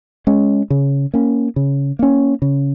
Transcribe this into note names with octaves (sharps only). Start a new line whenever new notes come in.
G#3 C#4
C#3
A#3 C#4
C#3
A#3 C#4
C#3